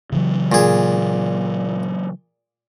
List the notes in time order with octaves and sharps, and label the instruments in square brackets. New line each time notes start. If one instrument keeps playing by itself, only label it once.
[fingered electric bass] C#3 E3 F#3
[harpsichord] A#2 G#4